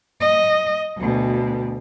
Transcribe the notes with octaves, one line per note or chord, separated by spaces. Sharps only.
D#5
D2 B2